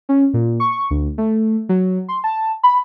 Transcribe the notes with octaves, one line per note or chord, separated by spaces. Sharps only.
C#4
A#2
C#6
D2
A3
F#3
C6
A5
B5